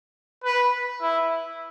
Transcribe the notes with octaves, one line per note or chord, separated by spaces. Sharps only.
B4
E4